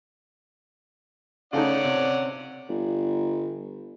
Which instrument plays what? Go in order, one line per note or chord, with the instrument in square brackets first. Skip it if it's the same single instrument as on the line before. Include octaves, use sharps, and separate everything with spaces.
[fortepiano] C#3 A3 D#4 [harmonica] C#4 D5 F#5
[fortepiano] C3
[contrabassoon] G1